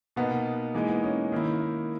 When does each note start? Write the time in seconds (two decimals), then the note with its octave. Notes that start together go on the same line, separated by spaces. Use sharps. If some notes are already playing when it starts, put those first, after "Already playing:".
0.16 B2 A#3 B3 D#4
0.74 E3 G#3 A#3 D#4
0.89 B3
1.04 C#4
1.32 D#3 A#3 E4
1.60 D#4